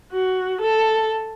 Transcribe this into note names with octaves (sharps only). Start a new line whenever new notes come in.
F#4
A4